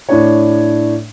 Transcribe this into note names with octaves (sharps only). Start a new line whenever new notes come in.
A2 D4 C#5